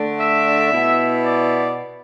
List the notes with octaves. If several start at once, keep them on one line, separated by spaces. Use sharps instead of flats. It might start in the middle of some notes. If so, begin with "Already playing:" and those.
Already playing: D3 A3 D4
E5
B2 B3 E4
D5